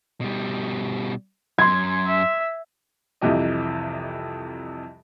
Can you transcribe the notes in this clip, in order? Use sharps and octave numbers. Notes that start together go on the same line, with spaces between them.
B2 G3
F#2 C6 G#6
E5
C2 F2 C3 E3 G4 D#5